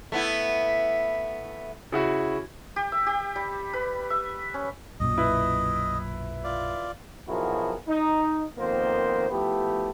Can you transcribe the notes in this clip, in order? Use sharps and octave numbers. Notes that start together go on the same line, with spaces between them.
A3 B3 E4
C#3 E4 F#4
G4
E5
G4
G3
B4
E5
C#4
B1 F#2 A#2 D#5
E4 B4
F4 D5
B1 F3 E4 F#4 G#4 A#4
D#4
F2 D#3 A#3 B3 C5
F3 A3 B3 E4 G4